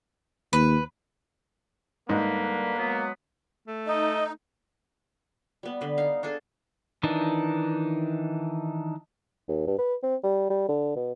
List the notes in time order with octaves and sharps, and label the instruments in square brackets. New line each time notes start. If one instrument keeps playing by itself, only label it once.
[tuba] D#2 [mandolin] B4
[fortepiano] G#2 [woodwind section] D3 G3 B4 [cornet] A#3
[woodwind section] F#3 G#3 B3
[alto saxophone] A3
[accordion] D#4 [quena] D#5
[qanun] G3 B3
D3 B4
D#4 F5
D4 G#4 A4 G#5
[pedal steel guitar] D#3 E3 D4 D#4
[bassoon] D#2
G2
B4
C4
G3
G3
D3
B2